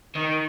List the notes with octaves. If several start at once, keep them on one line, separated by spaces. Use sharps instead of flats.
D#3